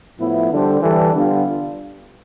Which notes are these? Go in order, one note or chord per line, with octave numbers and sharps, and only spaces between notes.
A2 F3 B3 E4
D3 G3 D4 A4 C5
E3 G3 D4 A4
D3 G3 B3 D4 F4